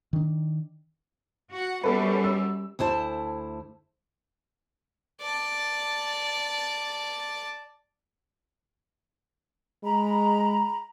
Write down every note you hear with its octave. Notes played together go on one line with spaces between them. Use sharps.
D#3 D4
F#4 F#5
F#2 G3 B3 A4 B4
E6
D2 E4 C5 A5
D5 A5
G#3 A#5 B5